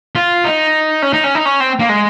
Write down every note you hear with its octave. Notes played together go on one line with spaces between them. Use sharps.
F4
D#4
C#4
D#4
C#4
D#4
C#4
C4
A#3
G#3